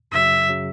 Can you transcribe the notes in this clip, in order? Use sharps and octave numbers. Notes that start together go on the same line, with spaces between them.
F#2 C#3 F#3 E5
C#3 F#3